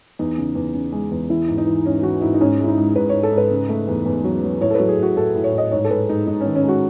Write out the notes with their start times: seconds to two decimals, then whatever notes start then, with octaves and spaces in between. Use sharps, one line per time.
0.19 E2 D#4
0.38 C#3
0.55 E2
0.74 C#3
0.92 G#3
1.11 E2
1.30 E3 E4
1.48 G#2
1.58 D#4
1.67 E3
1.85 G#2 C#4
2.03 E3 F#4
2.21 G#2 E4
2.34 D#4
2.40 G#2 C#4
2.59 G#3 E4
2.68 D#4
2.77 G#2
2.96 G#2 B4
3.09 G#2 C#5
3.23 A4
3.32 G#2
3.38 B4
3.50 C#3
3.69 A3
3.88 E2
4.06 E2
4.24 F#3
4.44 F#3
4.61 A2 C#5
4.71 A4
4.75 B4
4.80 F#3
4.88 G#4
4.98 A2
5.03 F#4
5.17 A2 A4
5.35 A2
5.44 C#5
5.53 A2
5.58 D#5
5.71 G#2 C#5
5.85 A4
5.90 G#3 B4
6.09 G#2 D#4
6.27 G#2 D#4
6.40 C#4
6.46 D#3
6.55 C#4
6.64 G#3 F#4